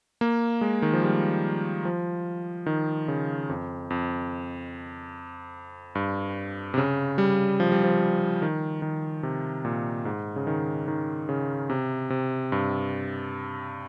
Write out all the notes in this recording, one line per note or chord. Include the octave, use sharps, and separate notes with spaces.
A#3
G#3
D#3
F3
G3
F3
D#3
C#3
F2
F2
G2
C3
C#3
G3
F3
G3
F3
D#3
D#3
C3
A#2
G#2
C#3
D#3
D#3
C#3
C3
C3
G2